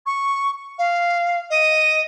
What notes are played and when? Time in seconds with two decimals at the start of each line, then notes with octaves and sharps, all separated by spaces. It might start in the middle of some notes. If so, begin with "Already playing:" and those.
0.06 C#6
0.78 F5
1.50 D#5